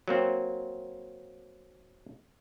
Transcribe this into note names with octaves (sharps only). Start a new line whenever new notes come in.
F#3 A#3 C4